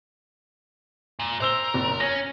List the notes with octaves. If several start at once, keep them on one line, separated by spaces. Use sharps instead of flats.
A#2
A#4 C5 E6 G7
F#1
C#4 A#6